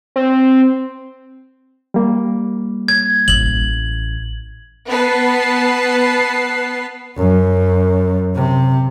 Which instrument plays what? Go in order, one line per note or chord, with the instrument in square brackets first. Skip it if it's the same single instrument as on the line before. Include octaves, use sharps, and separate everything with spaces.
[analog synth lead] C4
[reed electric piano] G3 A#3
[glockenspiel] G#6
[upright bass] A1 [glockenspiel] F#7
[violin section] B3 B4 A5 C7
[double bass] F#2
C3